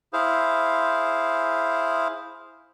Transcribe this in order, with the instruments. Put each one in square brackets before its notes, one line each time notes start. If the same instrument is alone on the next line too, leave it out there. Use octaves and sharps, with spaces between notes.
[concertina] E4 G#4 C5 F5